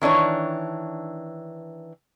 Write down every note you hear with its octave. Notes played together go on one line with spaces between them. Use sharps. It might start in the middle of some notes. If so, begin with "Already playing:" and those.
D#3 E3 D4 C#5